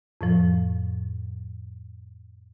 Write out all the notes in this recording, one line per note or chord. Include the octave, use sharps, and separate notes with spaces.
F2 A2 F3